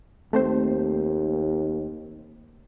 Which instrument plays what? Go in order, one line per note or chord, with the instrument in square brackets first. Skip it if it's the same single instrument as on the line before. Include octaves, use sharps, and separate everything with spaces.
[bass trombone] D#2 [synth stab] A3 C4 C5